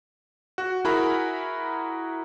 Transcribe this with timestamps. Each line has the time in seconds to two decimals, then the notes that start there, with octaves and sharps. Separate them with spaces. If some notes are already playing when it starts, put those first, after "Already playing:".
0.58 F#4
0.85 E4 F#4 G#4 A#4 A#5 B5